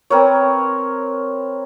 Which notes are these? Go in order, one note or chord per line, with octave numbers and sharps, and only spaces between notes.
C4 A#4 B4 C#5